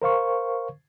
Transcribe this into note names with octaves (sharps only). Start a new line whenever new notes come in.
A#4 C5 F5 C#6